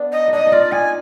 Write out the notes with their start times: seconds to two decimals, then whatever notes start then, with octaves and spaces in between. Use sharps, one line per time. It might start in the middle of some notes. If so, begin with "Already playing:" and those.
Already playing: B3 D4
0.12 D#5
0.28 D4 D#4 D#5
0.47 D#4
0.52 F4 D5
0.71 D#4 G#5